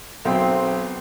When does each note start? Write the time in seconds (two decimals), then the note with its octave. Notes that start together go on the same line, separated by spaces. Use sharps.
0.25 B1 C4